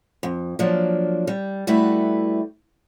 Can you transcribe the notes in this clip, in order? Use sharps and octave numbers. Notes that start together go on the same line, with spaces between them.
F2
F3 F#3 A#3 D4
G3
G3 A3 E4 F#4 B4